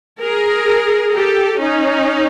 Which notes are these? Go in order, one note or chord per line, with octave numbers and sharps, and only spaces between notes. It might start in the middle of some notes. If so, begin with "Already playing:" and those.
G#4 A#4
G4 A4
C#4 D#4